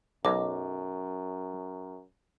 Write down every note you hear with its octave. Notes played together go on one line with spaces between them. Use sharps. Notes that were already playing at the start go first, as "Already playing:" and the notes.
B1 F#2 D#5 D6